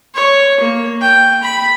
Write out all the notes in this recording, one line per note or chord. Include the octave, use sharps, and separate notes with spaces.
C#5
A#3
G5
B5